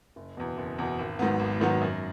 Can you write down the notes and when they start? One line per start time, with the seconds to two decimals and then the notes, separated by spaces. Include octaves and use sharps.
0.16 F#1
0.37 E2 B2
0.57 F#1
0.78 E2 B2
0.99 G#1
1.19 G#2 D#3 F#3 B3
1.39 G#1
1.60 G#2 D#3 F#3 B3
1.81 F#2